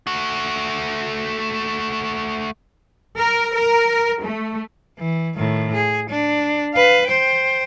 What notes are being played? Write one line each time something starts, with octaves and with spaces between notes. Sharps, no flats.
A3 F#4
A#4
A#4
A3
E3
A2 D#3
G#4
D4
B4 F5
C5 G5